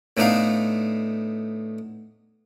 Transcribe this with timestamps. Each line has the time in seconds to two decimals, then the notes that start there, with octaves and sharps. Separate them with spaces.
0.17 A2 A3 B3 D4 D#4 F5